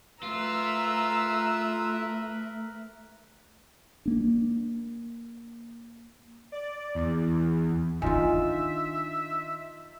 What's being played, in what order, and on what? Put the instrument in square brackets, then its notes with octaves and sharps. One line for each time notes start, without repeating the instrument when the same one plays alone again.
[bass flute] A3 [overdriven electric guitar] F4 [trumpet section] A#4 B4 E5 [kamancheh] A#5 E6
[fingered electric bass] A#3 D4
[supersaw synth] D5
E2
[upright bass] D#3 D4 [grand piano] D#4 F4 [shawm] E5 [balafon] G#5